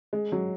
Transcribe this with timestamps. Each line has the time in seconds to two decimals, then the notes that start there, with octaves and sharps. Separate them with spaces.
0.13 G#3
0.32 F#3